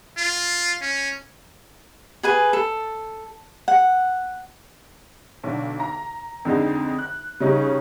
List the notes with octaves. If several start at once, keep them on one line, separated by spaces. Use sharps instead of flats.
F4
C#4
G#4 B4 G#5
A4
F#5
B1 D3
A#5
F2 D3 G#3 D#4
F#6
C#3 G3 C#4 D#4